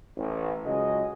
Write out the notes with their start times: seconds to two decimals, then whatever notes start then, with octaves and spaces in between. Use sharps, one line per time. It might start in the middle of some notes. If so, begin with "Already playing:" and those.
0.17 A1
0.65 C#2 C#3 F#3 G#3 C#4 D#5